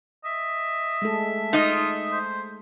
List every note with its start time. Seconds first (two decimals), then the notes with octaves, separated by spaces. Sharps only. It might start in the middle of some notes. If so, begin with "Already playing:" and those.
0.24 D#5 E5
1.02 G#3 A3 A4
1.53 D#4 F4 D#5
2.12 C5